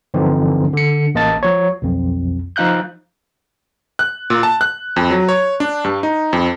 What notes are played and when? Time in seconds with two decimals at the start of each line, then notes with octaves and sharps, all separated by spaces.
0.14 G2 D3 E3 F3 C4 D#4
0.73 D3 C#7
1.15 A1 A#3 D#5 A5 A6
1.43 F3 C#5
1.82 B1 F2
2.56 F3 D#4 F5 F#6 G6
3.99 F#6
4.30 A#2
4.43 A5
4.61 F#6
4.96 F2
5.11 F#3
5.29 C#5
5.60 D4
5.84 G2
6.03 D#4
6.33 F2